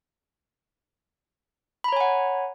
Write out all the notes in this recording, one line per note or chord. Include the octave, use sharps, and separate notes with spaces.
C#5 F#5 G#5 A#5 B5